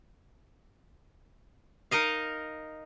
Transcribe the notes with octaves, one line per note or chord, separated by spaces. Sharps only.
D#4 A#4 D#5 F5